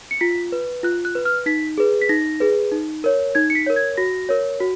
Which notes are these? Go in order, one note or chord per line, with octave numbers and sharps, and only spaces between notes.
C#7
F4 B6
B4
F4 F#6
F#6
B4
F6
D#4 B6
G#4 B4
B6
D#4 A#6
G#4 B4
D#4
A#4 C#5
D#4 G#6
C#7
B6
A#4 C#5
G#6
F#4 A#6
A#4 C#5
F#4